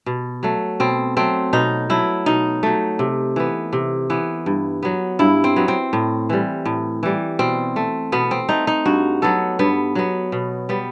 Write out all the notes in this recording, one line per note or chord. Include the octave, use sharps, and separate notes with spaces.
B2
F#3 A3
B2 C4
F#3 A3 C4
B2 D#4
F#3 A3 E4
B2 D#4
F#3 A3
C3
E3 B3
C3
E3 B3
G2
F#3 B3
G2 E4
C4
F#3 B3
C4
A2
E3 G3
A2
E3 G3
B2 C4
A3
B2 B3
C4
A3 D#4
D#4
G2 F#4
F#3 B3 A4
G2 B3
F#3 B3
B2
G3 B3